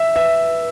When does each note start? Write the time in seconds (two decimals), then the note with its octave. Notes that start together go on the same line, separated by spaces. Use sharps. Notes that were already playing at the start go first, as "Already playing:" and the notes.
Already playing: E5
0.15 B4 E5